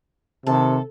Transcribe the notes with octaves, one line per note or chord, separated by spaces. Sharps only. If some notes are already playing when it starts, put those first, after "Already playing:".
C3 D#3 A4